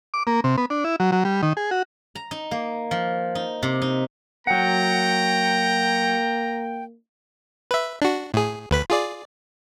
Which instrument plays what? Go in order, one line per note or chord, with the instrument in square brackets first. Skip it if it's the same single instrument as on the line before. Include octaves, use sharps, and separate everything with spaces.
[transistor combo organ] D6
A#3
C3
B3
D4
E4
F#3
F#3
G3
D#3
G#4
F#4
[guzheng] A#5
D#4
A#3
F3
D#4
C3
D#4
[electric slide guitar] F#3 F#5 [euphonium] A#3 [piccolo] G5 [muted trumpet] A#5
[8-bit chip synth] B4 E5
D4 F#4
A2 G#4
D2 B4 B5
F4 G#4 D5